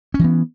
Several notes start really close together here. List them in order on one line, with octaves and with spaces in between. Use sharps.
C#4 E3 B3